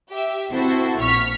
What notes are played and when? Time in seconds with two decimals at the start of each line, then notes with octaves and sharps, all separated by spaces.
0.10 G4 E5
0.50 C4 E4 F#4 A4 C5
0.98 A#1 C#6 F6 B6